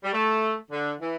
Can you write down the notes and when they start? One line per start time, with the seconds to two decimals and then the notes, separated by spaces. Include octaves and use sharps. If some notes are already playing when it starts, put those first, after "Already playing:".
0.03 G3
0.13 A3
0.71 D3
1.00 E3